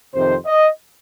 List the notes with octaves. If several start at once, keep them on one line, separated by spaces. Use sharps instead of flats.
F2 C3 D#3 C5
D#5